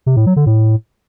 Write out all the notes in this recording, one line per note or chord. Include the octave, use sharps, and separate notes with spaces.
C3
A2
F#3
D3
A2